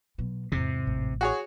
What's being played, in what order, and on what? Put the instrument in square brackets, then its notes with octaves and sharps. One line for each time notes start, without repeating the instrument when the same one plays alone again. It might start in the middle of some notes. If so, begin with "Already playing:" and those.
[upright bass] B2 F#3
[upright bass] E2 G#2 [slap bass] C3
[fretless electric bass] A1
[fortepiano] F#4 G#4 C#5